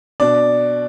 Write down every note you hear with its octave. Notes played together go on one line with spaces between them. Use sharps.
B2 D4 D5